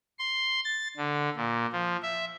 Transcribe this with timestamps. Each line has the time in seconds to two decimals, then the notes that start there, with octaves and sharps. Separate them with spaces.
0.19 C6
0.64 A6
0.97 D3
1.37 A#2
1.73 F3
2.02 E5